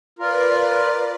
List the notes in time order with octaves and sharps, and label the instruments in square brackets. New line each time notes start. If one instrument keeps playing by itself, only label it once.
[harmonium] F4 A#4 [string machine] B4 D5